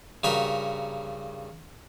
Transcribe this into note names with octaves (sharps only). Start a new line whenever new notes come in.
G2 C#3 F#4 A#4 B5